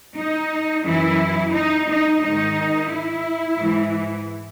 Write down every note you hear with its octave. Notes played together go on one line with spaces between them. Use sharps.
D#4
F#2 E3 E4
D#4
D#4
G#2 D#3 D#4
E4
G#2 E3